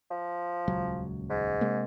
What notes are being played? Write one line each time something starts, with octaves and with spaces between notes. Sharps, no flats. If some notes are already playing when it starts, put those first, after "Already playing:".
F3
D#1 C#2 F#3
G#2
C3 G#3 A#3